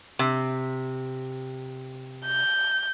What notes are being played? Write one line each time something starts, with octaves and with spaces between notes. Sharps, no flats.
C3
G6